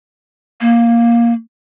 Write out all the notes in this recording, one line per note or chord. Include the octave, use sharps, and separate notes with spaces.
A#3